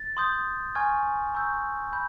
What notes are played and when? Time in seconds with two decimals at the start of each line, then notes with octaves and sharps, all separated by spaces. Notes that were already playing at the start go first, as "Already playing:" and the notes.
Already playing: A6
0.17 C6 D#6 G6
0.75 G#5 C#6 F6 G#6
1.34 A#5 C#6 E6 G6
1.93 B5 G6